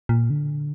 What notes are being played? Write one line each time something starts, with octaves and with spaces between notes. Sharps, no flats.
A#2
D3